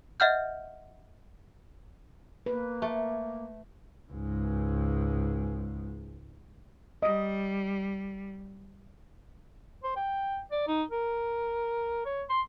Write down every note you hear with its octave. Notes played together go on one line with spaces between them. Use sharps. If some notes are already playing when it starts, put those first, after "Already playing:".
D#5 E5 F#5 F6 G6
A#3 B4
A3
C#2 G#2
G3 D#5
C5
G5
D5
D#4
A#4
C#5
C6